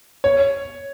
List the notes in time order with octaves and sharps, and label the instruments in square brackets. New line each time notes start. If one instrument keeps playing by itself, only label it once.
[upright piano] C#5